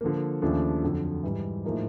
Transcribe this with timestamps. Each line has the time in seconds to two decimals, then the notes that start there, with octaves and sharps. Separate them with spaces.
0.01 D3 F3 A#3
0.42 D#2 C#3 F3 A3 D4
0.82 F2 D3 F#3
1.23 G#2 E3 G3
1.64 A2 F3 A#3 D#4 G#4